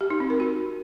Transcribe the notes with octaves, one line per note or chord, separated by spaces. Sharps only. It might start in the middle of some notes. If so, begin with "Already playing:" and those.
G4
D#4
C4
A#4
F#4